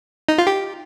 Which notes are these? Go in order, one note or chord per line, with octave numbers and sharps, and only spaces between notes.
D#4
F4
G4